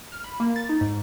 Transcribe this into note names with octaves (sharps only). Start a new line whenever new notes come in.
F6
B5
A#3
A6
D#4
G#2